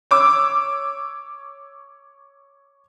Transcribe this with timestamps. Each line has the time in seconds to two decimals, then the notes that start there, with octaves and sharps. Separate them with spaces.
0.11 C#5 D6 E6